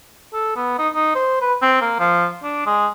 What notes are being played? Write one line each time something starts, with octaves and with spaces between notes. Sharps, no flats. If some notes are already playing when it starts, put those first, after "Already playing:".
A4
B3
D#4
D#4
C5
B4
C4
A#3
F3
D4
G#3